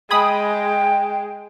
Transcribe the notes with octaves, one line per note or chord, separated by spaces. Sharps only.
G#3 G5 G#5 B5 D#6